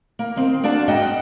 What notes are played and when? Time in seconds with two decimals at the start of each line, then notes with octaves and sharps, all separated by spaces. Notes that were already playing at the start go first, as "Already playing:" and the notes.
0.19 A#3
0.36 D#3 C4
0.63 A#3 D4 F#4 D5 A5
0.88 G#2 D#5 F#5 G5